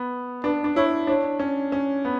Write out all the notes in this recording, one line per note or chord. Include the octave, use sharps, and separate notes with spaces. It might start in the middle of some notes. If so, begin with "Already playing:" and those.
Already playing: B3
D4 B4
D4
E4 C#5
D4 C#5
C#4
C#4
B3